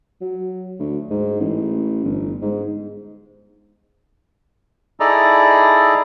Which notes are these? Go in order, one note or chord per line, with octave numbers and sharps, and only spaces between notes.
F#3
D2
G#2
A1
G1
G#2
D#4 E4 G#4 A4 D5 A#5